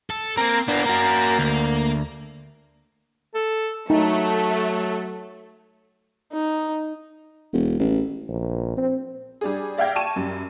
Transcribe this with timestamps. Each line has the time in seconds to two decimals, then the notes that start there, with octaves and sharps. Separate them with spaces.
0.10 A4
0.37 A#3 C4 A#4
0.68 A#3 B3 D4
0.86 F#4 A#4
1.39 D2
3.35 A4
3.90 F#3 A3 D#4
6.32 D#4
7.53 E1
7.79 A1
8.28 A#1
8.77 C4
9.41 G3 D4 G#4
9.78 D5 E5 F5 G5 G#6 A#6
9.96 A5 C#6 D#7 E7
10.16 F#2 G3